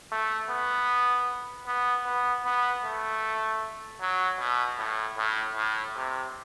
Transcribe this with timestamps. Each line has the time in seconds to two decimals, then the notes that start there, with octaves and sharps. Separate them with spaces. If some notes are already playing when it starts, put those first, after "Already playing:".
0.12 A3
0.50 B3
1.67 B3
2.06 B3
2.45 B3
2.84 A3
4.01 F#3
4.39 B2
4.79 A2
5.18 A2
5.56 A2
5.96 C3